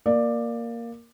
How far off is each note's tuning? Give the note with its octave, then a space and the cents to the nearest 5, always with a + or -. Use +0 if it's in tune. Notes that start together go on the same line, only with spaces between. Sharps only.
A#3 +0 D5 +10